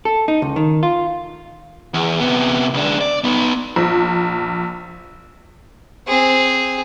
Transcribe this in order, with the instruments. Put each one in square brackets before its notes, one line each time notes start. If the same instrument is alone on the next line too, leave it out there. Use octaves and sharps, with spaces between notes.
[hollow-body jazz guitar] A4
D#4
C#2
D#3
F4
[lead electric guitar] E2
C3 B3
C#2 D4
D5
B3 D#4
[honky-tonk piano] A#1
[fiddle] C4 G#4